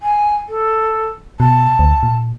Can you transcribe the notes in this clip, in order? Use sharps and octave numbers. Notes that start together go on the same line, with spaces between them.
G#5
A4
B2 A5
D2
A#2